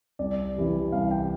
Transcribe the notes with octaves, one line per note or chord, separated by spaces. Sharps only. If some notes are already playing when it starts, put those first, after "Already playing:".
C2 D5
C3 E3 G3
C2 F5
G5